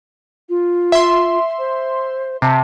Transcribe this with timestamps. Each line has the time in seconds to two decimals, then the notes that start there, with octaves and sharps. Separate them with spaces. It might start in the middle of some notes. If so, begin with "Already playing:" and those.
0.49 F4
0.92 E5 C6
1.59 C5
2.42 C3 A5